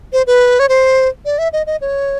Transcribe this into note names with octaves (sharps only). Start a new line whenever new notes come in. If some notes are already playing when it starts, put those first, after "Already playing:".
C5
B4
C#5
C5
D5
E5
D#5
D#5
C#5